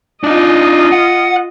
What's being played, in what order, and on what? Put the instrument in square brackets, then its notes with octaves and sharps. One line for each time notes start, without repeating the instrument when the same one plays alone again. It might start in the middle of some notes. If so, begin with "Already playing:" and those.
[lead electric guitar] D4 D#4 [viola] F4 D#5
[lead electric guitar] F#5